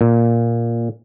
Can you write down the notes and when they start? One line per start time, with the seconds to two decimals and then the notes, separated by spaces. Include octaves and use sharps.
0.01 A#2